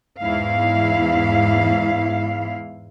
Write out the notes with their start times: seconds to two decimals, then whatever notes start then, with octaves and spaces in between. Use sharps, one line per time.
0.20 E2 G#2 E4 F5